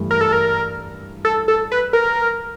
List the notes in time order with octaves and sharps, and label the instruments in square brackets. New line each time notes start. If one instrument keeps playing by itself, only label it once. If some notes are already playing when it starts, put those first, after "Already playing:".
Already playing: [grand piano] G2 E3 A3
[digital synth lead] A#4
A4
A#4
A4
A4
B4
A#4